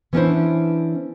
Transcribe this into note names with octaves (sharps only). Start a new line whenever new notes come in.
E3 B3 C#4 D4 E4 C5